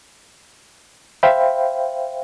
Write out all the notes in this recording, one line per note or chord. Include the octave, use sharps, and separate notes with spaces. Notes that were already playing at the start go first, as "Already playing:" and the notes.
C5 E5 F5 G5 B5